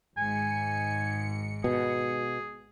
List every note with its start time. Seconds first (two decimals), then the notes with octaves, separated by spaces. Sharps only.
0.17 G#1 G#2 G#5 C#7
1.64 B2 G#4